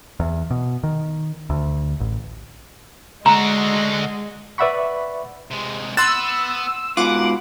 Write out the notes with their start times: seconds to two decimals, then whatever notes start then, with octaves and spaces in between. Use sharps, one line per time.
0.20 E2
0.51 B2
0.83 D#3
1.50 D2
2.00 A1
3.26 D3 G#3 F#4 A#5
4.58 B4 D5 E5 F#5 B5 C#6
5.51 C3 G#3
5.97 B3 C6 E6 F#6 A6
6.97 G#2 B2 F4 F#5 D6